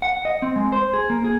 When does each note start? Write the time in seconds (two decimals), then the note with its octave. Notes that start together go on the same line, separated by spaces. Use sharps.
0.02 F#5
0.25 D#5
0.42 C4
0.56 G#3
0.72 C5
0.93 G#4
1.10 A#3
1.24 G#4